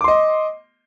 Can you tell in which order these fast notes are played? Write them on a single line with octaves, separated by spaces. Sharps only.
D6 C6 D#5